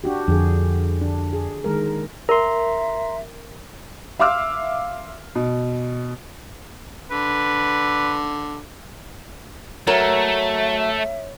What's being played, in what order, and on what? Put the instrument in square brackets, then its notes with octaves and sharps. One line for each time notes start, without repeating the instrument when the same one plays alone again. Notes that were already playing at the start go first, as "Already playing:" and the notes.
[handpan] D4 F#4 G4
[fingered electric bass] F2 [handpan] D3 G#4
[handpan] D4
G#4
D#3 G#3 A#4
[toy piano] A#4 [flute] E5 [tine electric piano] A#5 C6
[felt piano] E5 F5 C6 D6 E6 F6
B2
[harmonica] D3 [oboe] B4
[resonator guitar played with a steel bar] F#3 A#4 [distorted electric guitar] A3 [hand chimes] C#5 [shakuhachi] E5